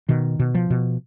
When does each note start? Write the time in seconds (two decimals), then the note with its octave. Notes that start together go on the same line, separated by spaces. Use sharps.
0.09 B2 D#3
0.39 B2
0.55 F3
0.70 B2